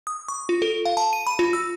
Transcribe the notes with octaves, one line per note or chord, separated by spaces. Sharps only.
D#6
C#6
F4
A4
F5
A5
D#7
B5
F4
E6